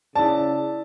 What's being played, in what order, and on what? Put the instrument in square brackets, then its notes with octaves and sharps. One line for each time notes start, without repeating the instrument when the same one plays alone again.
[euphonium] C#3 [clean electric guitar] E4 D5 [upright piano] A5